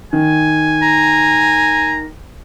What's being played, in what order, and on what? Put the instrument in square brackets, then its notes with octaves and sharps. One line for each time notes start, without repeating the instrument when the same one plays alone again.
[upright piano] D#3 [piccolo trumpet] G#5
[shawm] A#5